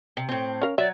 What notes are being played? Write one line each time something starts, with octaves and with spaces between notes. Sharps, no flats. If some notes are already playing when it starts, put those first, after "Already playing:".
C3
A2 C4
C#4 A#4 F5
F#3 D5 E5